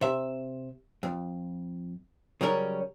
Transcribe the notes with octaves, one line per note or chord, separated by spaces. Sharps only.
C3 E5
F2
C#3 F#3 G3 C#4 A#4